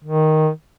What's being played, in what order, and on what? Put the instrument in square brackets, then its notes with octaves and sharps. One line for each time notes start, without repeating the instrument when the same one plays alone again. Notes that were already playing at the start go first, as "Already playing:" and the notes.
[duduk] D#3